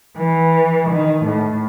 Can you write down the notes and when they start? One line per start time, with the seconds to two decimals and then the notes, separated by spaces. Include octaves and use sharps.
0.18 E3
0.90 D#3
1.26 A2